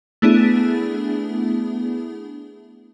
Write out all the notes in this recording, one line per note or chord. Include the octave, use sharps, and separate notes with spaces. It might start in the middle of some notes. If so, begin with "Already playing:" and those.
A3 B3 D4 E4 G#4